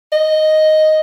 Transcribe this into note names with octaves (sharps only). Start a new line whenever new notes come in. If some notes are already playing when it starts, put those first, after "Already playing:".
D#5